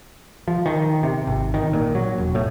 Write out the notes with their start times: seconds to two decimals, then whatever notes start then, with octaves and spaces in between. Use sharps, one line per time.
0.48 F3
0.66 D#3
1.03 C3
1.27 G#1
1.54 D#3
1.73 A#2
1.95 F#3
2.18 E1
2.35 A2